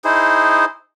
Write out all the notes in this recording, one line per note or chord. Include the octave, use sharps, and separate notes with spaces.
D#4 E4 G#4 C5